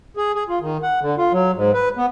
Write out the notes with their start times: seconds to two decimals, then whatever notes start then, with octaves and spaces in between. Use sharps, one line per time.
0.17 G#4
0.35 G#4
0.49 F4
0.61 D#3
0.83 F#5
1.02 D3
1.18 F4
1.32 F#3
1.55 G#2
1.74 B4
1.97 B3